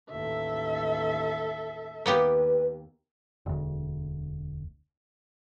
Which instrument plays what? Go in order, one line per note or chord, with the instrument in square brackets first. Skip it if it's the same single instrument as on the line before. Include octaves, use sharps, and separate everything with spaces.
[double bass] A1 D#2 [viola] A4 E5
[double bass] D#2 [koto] A#3 B3 G4 [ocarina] B4
[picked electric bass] E1 D2